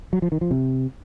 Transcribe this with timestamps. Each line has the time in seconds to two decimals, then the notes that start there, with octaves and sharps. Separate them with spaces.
0.13 F#3
0.22 F3
0.32 D#3
0.41 F3
0.51 C3